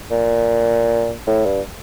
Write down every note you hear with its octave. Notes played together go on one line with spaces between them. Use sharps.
A#2
A2
G2